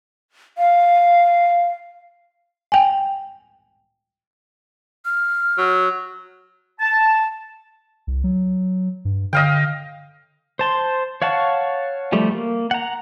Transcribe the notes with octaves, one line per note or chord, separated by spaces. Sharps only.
F5
G5 G#5
F6
F#3
A5
C2
F#3
G2
D3 D#5 F5 G5
C5 A5 C6
C#5 F5 F#5 A5 C#6
F3 G3 A3
A#3
F#5 A#5